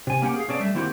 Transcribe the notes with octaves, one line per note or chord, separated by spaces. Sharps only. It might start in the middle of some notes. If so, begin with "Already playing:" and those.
C3 G#5
A#3 C#4 G4 F#5
G#4 F5
B2 C#4 G#4 D5 A5
G3 A3 E5
D#3 A#3 C4 E4 F#4 G4